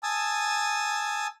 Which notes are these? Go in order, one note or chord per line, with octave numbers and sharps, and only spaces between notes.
G#5 A5 D#6 E6